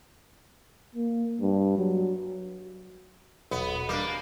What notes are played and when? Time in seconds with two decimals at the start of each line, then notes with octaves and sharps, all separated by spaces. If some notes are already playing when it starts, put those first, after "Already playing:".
0.95 A#3
1.41 G2
1.78 F#3
3.51 D#1 B1 B3
3.89 G3 A#3 D4
4.08 F5 G#5